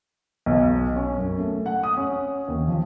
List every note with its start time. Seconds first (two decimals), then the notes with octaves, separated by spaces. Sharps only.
0.46 B1
0.96 C#4
1.17 F#2
1.39 A3
1.66 F#5
1.83 D#6
1.97 C#4
2.48 D#2
2.68 F3